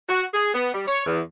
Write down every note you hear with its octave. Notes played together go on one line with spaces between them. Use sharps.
F#4
G#4
B3
G3
C#5
E2